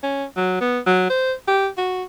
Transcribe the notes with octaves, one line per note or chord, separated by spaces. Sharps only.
C#4
F#3
B3
F#3
C5
G4
F#4